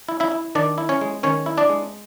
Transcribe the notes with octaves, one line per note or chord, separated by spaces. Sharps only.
E4
E4 E5
E4
D#3 D4 D5
E4
C#4 C#5
G#3
D#3 C#4 C#5
E4
D4 D5
G#3